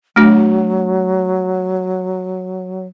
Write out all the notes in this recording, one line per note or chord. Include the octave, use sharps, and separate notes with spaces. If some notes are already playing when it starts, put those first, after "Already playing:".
F#3 A3 D4 F#4